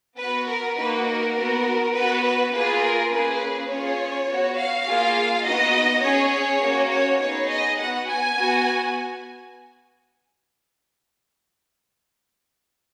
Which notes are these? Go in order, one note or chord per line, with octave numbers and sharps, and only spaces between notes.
B3 F#4 B4
A#4
A#3 D#4 F#4 B4
A#4
B3 F#4
B3 F#4 B4
B4
A#3 F4 G#4 B4
A#4
A#3 C#4 G#4 B4
C#4 F4 G#4 C#5
B3 F#4
F5
A#3 F4 G#4
B3 D#4 F#4 D#5
C#4 G#4 C#5
C#5
A#3 C#4 F#4
C#5
B3 D#4 G#4 C#5
D#5
B3 F#4 F#5
G#5
B3 F#4